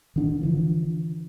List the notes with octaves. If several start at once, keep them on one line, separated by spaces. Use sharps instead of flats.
D#3 D4
D3 E3 F3